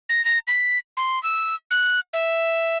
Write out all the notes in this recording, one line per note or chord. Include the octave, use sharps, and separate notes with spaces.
A#6
A#6
B6
C6
E6
F#6
E5